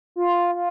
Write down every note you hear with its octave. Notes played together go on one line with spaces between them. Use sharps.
F4
F4